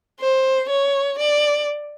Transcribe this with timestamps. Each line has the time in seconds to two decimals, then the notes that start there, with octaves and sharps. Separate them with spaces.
0.20 C5
0.69 C#5
1.18 D5